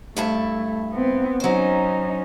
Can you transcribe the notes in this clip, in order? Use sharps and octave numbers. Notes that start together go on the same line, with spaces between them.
G2 A3 E4 A5
B3 C4
F#3 C#4 D#4 C5